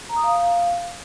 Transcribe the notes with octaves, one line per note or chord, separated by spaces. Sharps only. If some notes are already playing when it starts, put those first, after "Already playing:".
A#5
D#6
F5